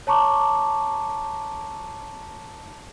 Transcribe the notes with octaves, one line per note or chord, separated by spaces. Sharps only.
C#5 A5 A#5 C#6 D6